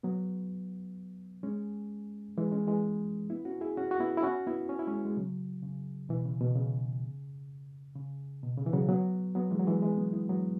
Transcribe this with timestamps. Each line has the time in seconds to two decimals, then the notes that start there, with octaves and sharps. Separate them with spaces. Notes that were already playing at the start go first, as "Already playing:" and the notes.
0.03 F#3 B3
1.43 G#3 C#4
2.38 E3 G#3
2.52 G#3 C#4
2.67 E3 G#3
3.30 B3 E4
3.45 C#4 F#4
3.61 E4 G#4
3.77 C#4 F#4
3.91 F#4
4.00 B3 E4
4.17 E4
4.23 C#4 F#4
4.46 B3 E4
4.69 C#4
4.79 E4
4.87 G#3 C#4
5.05 G#3
5.17 C#3 F#3
5.62 C#3
6.09 B2 E3
6.25 C#3
6.41 B2
6.56 C#3
7.95 C#3
8.43 B2
8.58 C#3
8.66 E3
8.73 C#3 F#3
8.89 F#3 B3
9.35 F#3 B3
9.51 E3 G#3
9.59 F#3
9.66 E3 G#3
9.82 E3 G#3
9.97 F#3 B3
10.13 B3 E4
10.29 F#3 B3